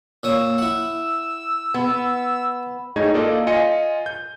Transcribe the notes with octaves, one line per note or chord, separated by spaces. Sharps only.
A#2 C#5 D#6 E6
E4 F#5
B3
A2 A3 D#4 G#4 D#5 G#6
A#3 F4 A4 D5 D#5
F4 D#5 G#5 C#7
G6